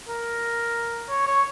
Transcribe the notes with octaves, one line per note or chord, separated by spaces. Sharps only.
A#4
C#5
C#5